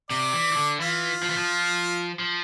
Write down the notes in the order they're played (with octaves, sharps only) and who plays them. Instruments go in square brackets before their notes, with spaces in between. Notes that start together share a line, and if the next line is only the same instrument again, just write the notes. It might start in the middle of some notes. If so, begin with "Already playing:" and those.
[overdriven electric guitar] C3 [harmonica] D5
[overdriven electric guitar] E3
E3
D3
[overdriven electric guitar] E3 [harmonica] F4
[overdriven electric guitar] F3
E3
F3
F3